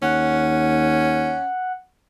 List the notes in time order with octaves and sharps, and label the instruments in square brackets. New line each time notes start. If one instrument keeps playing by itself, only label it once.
[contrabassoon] D#2 [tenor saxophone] C#4 [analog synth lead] F#5